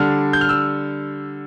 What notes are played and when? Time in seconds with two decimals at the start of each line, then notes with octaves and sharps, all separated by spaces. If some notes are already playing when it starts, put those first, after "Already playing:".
Already playing: D3 G3 D4 F6
0.33 G6
0.41 F6
0.49 E6